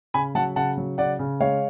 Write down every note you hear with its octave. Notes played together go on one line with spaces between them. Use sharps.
C#3 G#5 B5
F#3 F#5 A5
C#3 F#5 A5
F#3
C#3 D5 F#5
C#3
G#3 C#5 F5